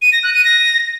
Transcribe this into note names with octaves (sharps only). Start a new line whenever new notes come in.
D#7
A#6
F#6
D#7
A#6